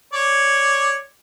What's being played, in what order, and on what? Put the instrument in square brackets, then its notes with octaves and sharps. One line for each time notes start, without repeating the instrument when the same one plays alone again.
[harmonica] C#5 D5